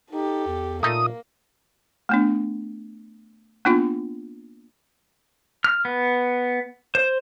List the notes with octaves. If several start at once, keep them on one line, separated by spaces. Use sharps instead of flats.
D#4 G4 A4
E2
A#2 A3 A#3 D#4 D#6
A3 B3 D4
A#3 B3 D4 D#4 F4
F6
B3
C5